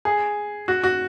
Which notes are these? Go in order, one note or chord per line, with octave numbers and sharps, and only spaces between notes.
G#4
F#4
F#4